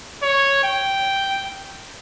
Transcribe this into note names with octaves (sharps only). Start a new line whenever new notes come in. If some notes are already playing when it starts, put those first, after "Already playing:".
C#5
G5